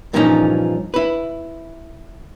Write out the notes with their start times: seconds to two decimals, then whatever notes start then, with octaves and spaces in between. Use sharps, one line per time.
0.13 G2 A#2 E3 F3 C#4 D#4
0.94 E4 B4